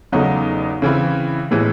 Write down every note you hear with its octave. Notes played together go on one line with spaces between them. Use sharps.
E2 C#3 F#3 A3 D#4
C#3 E3 C4 E4
A2 E3 G#3